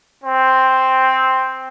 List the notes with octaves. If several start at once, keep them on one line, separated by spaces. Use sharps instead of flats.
C4